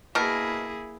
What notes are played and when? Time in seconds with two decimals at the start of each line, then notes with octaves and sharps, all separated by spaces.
0.15 B2 A#3 E4 G#4 A#4